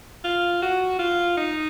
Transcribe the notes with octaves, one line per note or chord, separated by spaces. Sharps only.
F4
F#4
F4
D#4